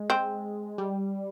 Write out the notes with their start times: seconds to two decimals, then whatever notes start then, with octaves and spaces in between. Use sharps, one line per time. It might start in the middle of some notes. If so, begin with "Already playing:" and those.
Already playing: G#3
0.10 C4
0.78 G3